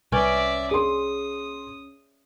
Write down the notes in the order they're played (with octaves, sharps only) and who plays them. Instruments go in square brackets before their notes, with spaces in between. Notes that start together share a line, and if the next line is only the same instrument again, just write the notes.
[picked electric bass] C2 [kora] C#4 [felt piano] B4 [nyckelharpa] D5 E5
[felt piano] G#4 C6 [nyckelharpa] D#6